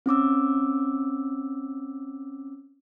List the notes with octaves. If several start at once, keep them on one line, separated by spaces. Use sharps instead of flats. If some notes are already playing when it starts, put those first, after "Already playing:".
C4 C#4 D6 E6